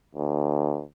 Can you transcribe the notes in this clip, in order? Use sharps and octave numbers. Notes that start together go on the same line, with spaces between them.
D2